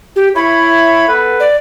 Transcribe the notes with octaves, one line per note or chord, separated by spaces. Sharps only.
G4
E4 C#5 B5
B3 A4 B4
D5